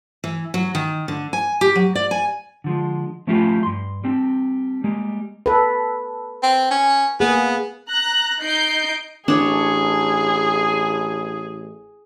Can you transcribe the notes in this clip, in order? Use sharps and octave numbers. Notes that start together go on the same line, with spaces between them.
E3
F#3
D#3
D3
G#5
G4
F#3
D5
G#5
D3 F3 G#3
F3 A3 C#4 E4 F4 G4
G2 C6
G3 C4 D4
G3 G#3 A#3
A4 B4
C4
C#4
A#3 B3 G#4
A#5 F#6
D#4 G6 C7 D7
A1 D4 G#4 C#5